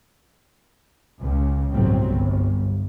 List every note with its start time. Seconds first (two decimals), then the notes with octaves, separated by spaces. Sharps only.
1.20 C#2 C#3
1.72 G1 C2 A2 F#3 G3 C4
2.06 G1 G2